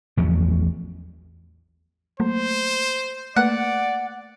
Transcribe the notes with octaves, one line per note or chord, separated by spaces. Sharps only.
A1 E2 F3 F#3
F#3 A3 A#3 C5
A3 A#3 B4 D5 F#5